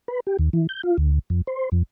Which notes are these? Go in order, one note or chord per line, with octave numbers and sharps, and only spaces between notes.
B4
G4
D#2
E3
G6
F4
D2
F2
C5
F2